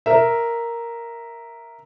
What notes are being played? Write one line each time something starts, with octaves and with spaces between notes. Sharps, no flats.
A#4 E5